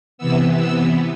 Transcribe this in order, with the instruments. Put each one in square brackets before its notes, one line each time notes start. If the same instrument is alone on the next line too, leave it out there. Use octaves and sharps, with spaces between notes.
[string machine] C3 E3 B3 E6
E6